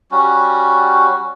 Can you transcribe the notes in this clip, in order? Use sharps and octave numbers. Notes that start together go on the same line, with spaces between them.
G3 C#4 F#4